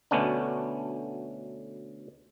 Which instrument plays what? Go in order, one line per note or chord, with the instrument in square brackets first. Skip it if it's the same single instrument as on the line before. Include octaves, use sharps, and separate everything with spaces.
[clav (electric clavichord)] D2 B2 A3 B3 C#4 D4